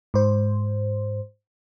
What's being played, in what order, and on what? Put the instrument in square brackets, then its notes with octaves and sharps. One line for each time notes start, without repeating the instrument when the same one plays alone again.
[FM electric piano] G#2 C5